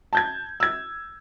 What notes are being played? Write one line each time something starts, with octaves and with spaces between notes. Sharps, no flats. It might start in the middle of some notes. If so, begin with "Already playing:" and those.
A5 G6 G#6
E6 G#6